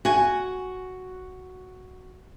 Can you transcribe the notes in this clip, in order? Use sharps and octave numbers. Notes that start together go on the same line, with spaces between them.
F#4 G#5